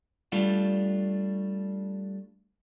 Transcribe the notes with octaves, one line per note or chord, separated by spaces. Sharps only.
G3 A3 D4 F4